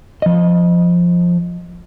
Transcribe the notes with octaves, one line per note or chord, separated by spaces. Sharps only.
F3 D#5